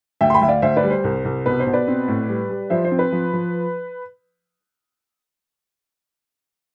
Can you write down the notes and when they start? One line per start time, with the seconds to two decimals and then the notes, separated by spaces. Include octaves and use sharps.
0.21 D2 E5 G5
0.30 C6
0.34 G5 B5
0.41 D2 E5
0.48 D5 F5
0.62 D2 C5 E5
0.77 B4 D5
0.83 G3
0.90 C5
1.04 C2
1.25 C2
1.46 B2 B4
1.60 C5
1.66 B2
1.73 B4 D5
1.88 C4
2.08 A2
2.29 G3
2.50 G3
2.70 F3 C5 E5
2.84 C5
2.91 C4
2.99 B4
3.12 F3
3.33 F3